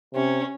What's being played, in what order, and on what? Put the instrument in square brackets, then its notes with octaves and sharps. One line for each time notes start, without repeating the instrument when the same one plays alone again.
[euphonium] C3 [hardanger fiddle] C#4